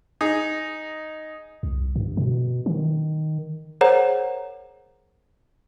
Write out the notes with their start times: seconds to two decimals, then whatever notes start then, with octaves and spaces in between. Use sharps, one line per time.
0.21 D#4 G#4
1.63 C2
1.96 G2
2.17 B2
2.66 D#3
3.81 G#4 A#4 C5 C#5 F#5 A#5